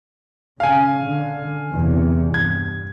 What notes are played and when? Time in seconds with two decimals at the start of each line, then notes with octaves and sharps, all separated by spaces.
0.60 C#3 C#4 F5 G#5
1.04 D3
1.72 E2 C3
2.34 G2 G#6